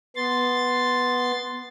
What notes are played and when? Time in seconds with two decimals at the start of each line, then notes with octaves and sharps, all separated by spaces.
0.16 B3 C6 A6